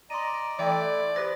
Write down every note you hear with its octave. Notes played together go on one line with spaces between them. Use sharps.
D5 D#5 A#5 C6 D#7
E3 A3 E4 D5 E5 G5
G4 B4 C5 A#6